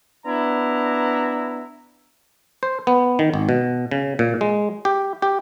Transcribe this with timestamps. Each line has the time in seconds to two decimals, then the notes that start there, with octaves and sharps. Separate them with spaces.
0.25 B3 D4 E4 A#5
2.63 C5
2.87 B3
3.19 D#3
3.34 G#1
3.49 B2
3.91 C#3
4.19 A#2
4.41 G#3
4.85 G4
5.22 G4